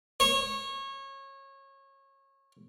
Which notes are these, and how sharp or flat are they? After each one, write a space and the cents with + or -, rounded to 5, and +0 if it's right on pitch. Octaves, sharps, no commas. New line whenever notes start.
C#5 -25